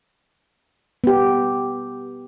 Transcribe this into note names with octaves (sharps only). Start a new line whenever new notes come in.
B3 G4